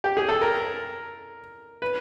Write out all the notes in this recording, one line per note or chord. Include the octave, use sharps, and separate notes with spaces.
G4
G#4
A4
A#4
B4